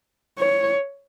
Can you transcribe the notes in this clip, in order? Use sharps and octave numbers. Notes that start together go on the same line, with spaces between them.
C#5